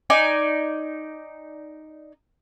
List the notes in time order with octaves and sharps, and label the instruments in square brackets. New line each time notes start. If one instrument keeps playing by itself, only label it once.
[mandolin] D#4 D5 G#5